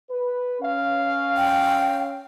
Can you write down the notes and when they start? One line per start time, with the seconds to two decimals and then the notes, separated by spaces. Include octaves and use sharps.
0.10 B4
0.61 C#4 F5
1.37 G5